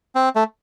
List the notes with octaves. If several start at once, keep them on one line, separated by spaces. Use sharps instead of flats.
C4
A3